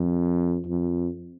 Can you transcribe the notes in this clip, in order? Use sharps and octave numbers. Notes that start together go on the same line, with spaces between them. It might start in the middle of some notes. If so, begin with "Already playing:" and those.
Already playing: F2
F2